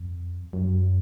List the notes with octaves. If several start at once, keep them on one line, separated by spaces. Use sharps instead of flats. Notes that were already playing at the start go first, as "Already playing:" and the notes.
Already playing: F2
F#2